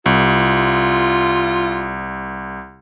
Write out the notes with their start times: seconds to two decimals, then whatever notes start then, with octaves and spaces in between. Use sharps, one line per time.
0.06 C2 F4